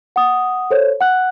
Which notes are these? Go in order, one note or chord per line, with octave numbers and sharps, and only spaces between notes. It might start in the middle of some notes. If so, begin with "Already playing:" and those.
F#5 D#6
A4 C5 C#5
F#5 F#6